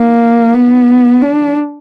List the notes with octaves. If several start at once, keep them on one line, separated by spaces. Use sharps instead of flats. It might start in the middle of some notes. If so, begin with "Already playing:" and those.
Already playing: A#3
B3
D4